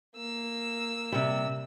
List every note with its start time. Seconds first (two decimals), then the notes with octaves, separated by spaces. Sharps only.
0.16 A#3 E6
1.12 C3 G3